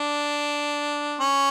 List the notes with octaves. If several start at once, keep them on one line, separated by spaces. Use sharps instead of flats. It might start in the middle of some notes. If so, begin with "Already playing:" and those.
Already playing: D4
C#4